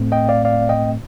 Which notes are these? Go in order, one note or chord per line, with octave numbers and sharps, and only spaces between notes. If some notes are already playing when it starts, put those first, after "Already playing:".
Already playing: A2 A3 C4
D#5 G5
D5 F5
D5 F5
D#5 G5